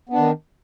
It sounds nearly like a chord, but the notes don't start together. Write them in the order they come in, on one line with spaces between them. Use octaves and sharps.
B3 D4 D#3